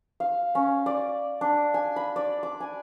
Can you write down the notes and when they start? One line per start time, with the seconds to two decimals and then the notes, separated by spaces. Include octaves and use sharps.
0.20 F5
0.55 C#4
0.86 D5
1.41 D4
1.74 G#5
1.96 B5
2.16 D5
2.43 D6
2.60 G#5